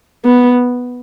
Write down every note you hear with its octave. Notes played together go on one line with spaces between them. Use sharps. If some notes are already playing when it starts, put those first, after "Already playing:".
B3